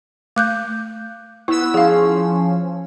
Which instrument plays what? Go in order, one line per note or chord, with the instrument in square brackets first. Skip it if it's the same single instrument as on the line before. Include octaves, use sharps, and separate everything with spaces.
[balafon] A3 [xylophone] D6 F#6 G6
[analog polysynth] B3 E6 [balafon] E4
[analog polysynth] F3 C#4 [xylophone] G#4 F5